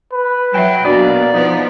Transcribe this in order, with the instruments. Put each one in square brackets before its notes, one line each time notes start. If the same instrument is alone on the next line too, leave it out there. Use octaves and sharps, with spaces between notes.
[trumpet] B4
[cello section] F#3 [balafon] E5 G#5 [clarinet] G5
[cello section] B2 [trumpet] A#3 [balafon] D4 F#4 [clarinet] D5
[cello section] F3 B3 [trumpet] D#4